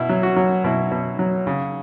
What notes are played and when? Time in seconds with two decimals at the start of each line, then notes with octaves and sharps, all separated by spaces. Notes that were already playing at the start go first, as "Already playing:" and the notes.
Already playing: B2 E4
0.09 F#3
0.23 F#4
0.36 F#3
0.64 B2 E4
0.91 B2
1.19 F#3
1.47 C#3